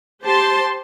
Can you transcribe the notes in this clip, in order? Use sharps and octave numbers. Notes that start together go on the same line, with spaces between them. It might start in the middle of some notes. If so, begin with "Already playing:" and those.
G4 C5 A5 C6